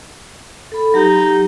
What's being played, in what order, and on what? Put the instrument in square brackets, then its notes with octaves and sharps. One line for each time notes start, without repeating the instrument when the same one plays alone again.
[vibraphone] A4 B5
[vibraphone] F#3 G4 F#5 [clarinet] D#4